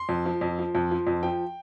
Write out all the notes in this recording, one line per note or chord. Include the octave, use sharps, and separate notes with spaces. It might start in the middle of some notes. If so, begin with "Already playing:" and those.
Already playing: C6
F2
F3
F2
F3
F2
F3
F2
F3 G5